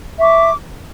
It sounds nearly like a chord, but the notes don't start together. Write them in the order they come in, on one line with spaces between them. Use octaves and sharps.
E5 C#6 D6